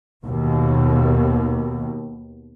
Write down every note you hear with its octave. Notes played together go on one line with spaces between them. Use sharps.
D#2 B2